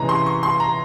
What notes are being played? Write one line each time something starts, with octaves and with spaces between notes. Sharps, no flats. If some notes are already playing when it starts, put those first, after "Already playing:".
Already playing: C3 E3 G#3 C#4 A#5
C6
C#6
C6
A#5